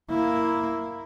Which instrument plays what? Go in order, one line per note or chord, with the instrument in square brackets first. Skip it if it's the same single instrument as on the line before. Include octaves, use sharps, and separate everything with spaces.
[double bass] A#3 E4